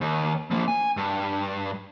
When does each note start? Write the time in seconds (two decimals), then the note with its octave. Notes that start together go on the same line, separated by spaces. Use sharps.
0.01 D#2
0.51 F3 A#3
0.68 G#5
0.97 G2